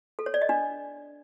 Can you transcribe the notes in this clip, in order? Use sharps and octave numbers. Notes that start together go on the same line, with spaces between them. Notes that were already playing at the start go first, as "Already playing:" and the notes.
A4
C#5
D5
D#5
D4